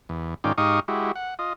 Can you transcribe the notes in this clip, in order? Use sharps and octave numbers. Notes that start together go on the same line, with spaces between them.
E2
G#2 D#3 C#4 F4 D5 G5
G#2 D#4 G4 F5 C#6 D#6
G#3 E4 F#4 G4
F#5
F4 D#5